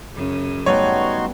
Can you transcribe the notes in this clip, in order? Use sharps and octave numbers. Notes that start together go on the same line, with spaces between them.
F#2 C#3
G3 A3 B3 D#4 F#4 C#5 C6